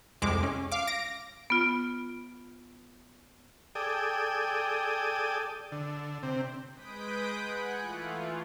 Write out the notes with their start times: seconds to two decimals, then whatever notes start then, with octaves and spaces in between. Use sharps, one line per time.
0.22 C2 F2 G#3 D6
0.43 C#4
0.72 F5 D6
0.87 A#6 D7
1.50 B3 F4
3.75 G#4 A4 D5 G5 D#6
5.72 D3
6.23 C3 C4
6.73 G#3 B4 D#6 G6 B6 D7
7.36 F#5 G#5 F#6
7.77 E3 A3 F4